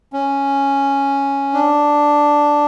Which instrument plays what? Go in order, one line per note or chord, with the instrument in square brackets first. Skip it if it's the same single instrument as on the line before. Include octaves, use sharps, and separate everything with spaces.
[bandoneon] C#4
D4